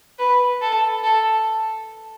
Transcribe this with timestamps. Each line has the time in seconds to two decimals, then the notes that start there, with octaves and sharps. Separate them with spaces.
0.19 B4
0.62 A4
1.03 A4